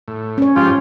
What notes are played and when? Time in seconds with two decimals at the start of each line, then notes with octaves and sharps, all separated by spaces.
0.08 A2
0.38 C#4 C#5
0.56 G#2 F3 F4 G4